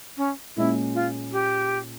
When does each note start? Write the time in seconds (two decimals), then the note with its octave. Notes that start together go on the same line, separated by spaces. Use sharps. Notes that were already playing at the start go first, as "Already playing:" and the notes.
0.17 C#4
0.56 A#2 G#3 C#4 E4
0.95 F4
1.32 G4